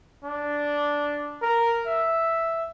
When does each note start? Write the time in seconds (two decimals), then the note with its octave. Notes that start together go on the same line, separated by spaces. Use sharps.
0.24 D4
1.42 A#4
1.87 E5